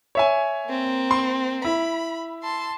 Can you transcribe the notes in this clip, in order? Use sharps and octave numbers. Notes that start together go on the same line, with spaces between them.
C#5 E5 G#5
A#3 C4
C6
E4 B5
A5 C6